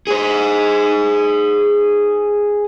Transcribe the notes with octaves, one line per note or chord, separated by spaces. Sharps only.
G#4 C5